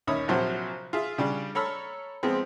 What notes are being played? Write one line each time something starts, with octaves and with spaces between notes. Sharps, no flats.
D#2 C#4 C#5 E5 B5 D#6
A#1 C3 F3 F#3 C5 F#5
F4 G#4 E5
C#3 G3 D4
A4 C#5 A#5 B5 E6 F6
F3 G#3 B3 C4